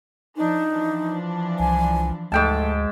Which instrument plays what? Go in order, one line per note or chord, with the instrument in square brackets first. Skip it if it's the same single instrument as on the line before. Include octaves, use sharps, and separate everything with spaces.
[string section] F3 D4 [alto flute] D#4
[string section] E3 F3 D4
[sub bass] C2 [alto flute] G#5
[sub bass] D2 [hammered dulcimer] G#2 G5 A5 [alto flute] A3